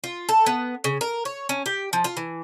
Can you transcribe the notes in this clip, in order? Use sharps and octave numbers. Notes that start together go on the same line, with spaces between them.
F4
A4
B3
C#3
A#4
C#5
C#4
G4
F3
F4
E3